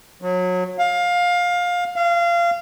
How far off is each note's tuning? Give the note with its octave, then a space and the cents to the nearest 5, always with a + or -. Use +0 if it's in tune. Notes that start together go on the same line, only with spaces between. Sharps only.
F#3 -25
F5 +20
F5 -25